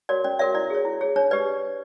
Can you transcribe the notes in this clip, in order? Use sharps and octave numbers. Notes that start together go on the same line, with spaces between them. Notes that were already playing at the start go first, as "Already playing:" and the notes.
F#4 A#4 C#5 D5
C#4 D5
F#4 A#4 C#5 D5 E5
E4 D5
G#4 C#5
E4
G#4 C#5
D4 C#5
G4 B4 D5